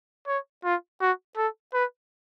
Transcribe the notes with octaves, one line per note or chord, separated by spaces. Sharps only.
C#5
F4
F#4
A4
B4